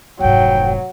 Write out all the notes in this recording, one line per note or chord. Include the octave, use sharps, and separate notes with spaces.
F1 G#2 F#3 G5